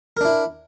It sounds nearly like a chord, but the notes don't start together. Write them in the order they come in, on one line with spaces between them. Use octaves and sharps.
A#4 D4 E4